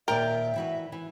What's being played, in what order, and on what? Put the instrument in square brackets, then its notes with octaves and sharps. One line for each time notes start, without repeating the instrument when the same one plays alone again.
[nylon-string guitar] D#2 A#2 D5 [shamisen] A#4 [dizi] E5 [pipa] G5
[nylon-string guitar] E3 F#4 B4
E3